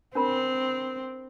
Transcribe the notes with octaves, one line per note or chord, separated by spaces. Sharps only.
C4 D4 A#4 B5